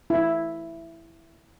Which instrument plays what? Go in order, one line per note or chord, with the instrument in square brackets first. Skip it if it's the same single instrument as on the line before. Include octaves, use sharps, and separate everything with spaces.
[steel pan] E4